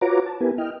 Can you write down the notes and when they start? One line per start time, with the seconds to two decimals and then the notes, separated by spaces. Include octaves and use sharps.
0.01 F4 F#4 B4 C#5 A#5 D6
0.26 A5
0.40 B3 E4 G4 A#4 B4 G#5
0.58 E4 D#5 G5 F6